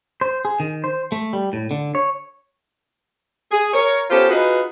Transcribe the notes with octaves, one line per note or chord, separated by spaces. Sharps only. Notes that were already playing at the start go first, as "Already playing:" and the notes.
C5
G#4
D#3
C5
A3
G3
A2
D3
C#5
G#4
A#4 C#5
B3 C#4 F4 G4 A4 C5
D#4 F4 F#4 G#4 B4